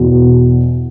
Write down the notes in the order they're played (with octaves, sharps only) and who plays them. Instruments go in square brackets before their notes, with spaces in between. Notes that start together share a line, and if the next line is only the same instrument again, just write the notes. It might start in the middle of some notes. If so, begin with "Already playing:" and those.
Already playing: [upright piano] E2 B2